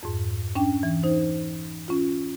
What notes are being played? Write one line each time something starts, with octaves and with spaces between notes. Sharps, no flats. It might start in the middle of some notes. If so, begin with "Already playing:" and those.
F2 G#2
C#4 D4 G5
E3
D#4 C5
C#4 F4